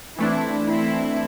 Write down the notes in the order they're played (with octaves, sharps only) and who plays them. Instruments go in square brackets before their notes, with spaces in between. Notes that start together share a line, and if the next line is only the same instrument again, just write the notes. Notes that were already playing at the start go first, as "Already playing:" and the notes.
[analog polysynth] E3 A3 D4 [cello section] C4 E4
[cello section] C4 E4